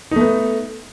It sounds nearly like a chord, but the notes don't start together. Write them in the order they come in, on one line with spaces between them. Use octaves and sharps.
D#4 A3 B3